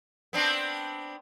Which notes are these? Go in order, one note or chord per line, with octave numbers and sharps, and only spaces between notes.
B3 C4 D4